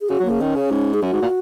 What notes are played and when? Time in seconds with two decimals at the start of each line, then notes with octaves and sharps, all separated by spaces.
0.01 G#4
0.09 C#3 F#4
0.20 F#3
0.25 C#3 A#3
0.40 D#3 C#4
0.55 C#3
0.71 G#2
0.94 G#4
1.02 F#2 F#4
1.13 G#2
1.22 A#2